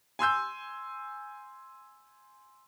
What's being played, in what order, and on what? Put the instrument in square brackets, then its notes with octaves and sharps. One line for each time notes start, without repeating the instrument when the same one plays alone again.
[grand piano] G#5 C6 E6 G6